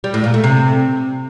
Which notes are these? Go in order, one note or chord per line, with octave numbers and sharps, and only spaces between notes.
G3
A2
A#2
A3
C3